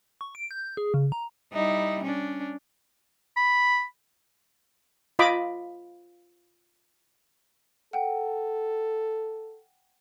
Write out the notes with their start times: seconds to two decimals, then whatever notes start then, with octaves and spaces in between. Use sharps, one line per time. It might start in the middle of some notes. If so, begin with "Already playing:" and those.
0.21 C#6
0.35 D7
0.51 G6
0.77 G#4
0.94 C#3
1.12 A#5
1.53 G3 D#4 E4
2.04 C#4 D4
3.37 B5
5.19 F4 D#5 B5 D6
7.93 A4 F#5 G5